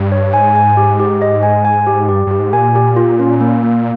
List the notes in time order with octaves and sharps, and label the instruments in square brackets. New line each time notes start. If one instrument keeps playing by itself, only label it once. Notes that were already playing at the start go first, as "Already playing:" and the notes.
Already playing: [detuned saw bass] G2
[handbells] C#5
[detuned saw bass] G#2 [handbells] G#5
[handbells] G#5
G4
G4
D#5
G#5
G#5
G4
[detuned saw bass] G2 [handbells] G4
[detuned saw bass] G2 [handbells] G4
[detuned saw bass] G#2
[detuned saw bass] A#2 [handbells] G#5
[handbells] G4
F4
C#4
A#3
A#3